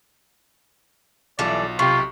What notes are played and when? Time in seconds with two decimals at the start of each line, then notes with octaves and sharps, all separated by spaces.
1.39 B1 E3 G3 F4 A4 D5
1.79 B1 C3 F4 G4 C#6